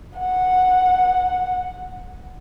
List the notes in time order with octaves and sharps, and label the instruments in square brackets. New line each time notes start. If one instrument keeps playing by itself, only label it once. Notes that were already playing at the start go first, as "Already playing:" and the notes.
[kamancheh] F#5